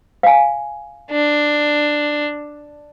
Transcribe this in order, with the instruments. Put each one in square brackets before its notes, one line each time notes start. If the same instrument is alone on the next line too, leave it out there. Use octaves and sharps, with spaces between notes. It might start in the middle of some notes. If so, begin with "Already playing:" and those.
[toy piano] F5 G#5
[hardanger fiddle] D4